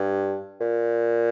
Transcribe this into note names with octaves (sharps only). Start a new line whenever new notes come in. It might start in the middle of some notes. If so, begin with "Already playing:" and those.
Already playing: G2
A#2